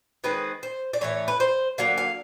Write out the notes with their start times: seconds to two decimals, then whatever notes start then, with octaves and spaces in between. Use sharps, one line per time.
0.24 D#3 G#3 C4 B4
0.63 C5
0.93 D5
1.01 A2 E3 A3 C#5
1.28 B4
1.40 C5
1.78 D3 F#3 A#3 F5
1.98 F5